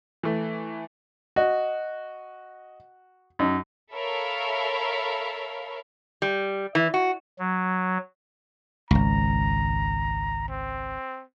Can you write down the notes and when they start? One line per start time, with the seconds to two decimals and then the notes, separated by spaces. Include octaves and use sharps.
0.23 E3 A3
1.36 F#4 D#5
3.39 F#2 D#4
3.93 A4 A#4 C#5 E5 F5 B5
6.22 G3
6.75 E3
6.94 F#4
7.39 F#3
8.91 G#1 C#2 A#5
10.49 C4